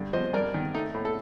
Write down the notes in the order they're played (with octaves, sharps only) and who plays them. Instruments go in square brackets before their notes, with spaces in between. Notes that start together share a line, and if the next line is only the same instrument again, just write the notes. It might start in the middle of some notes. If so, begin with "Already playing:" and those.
Already playing: [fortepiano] G2 D3
F3 C5 D#5
G2 A#4 D5
D#3
A3 D#4
A2
A4